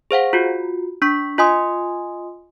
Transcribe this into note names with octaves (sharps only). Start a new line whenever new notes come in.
G#4 C5 F5 F#5
F4 F#4
D4 C#6 B6
F4 D#5 G#5 C6 D#6